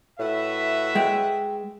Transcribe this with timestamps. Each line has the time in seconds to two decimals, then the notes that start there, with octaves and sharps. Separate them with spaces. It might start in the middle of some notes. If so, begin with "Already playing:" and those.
0.19 A2 F#4 B4 E5
0.95 G#3 G5